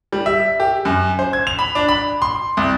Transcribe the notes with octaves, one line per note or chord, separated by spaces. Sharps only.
G3
E5
G4
F#2
C5
G#6
F7
B5
D4
B5
C6
C2